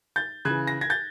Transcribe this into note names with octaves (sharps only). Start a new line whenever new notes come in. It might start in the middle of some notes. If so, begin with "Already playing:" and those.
G6 A6
C#3 F#6 G#6
E3
A#6
G#6 A#6
G6 A6